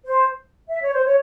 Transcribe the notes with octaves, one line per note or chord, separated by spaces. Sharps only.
C5
E5
C#5
C5
C#5